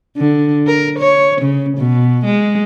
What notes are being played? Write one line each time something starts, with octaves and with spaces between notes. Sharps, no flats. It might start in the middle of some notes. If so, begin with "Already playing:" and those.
D3
A#4
C#5
C#3
B2
G#3